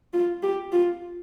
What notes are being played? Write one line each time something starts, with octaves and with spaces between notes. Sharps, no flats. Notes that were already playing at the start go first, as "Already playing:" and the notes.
F4
G4
F4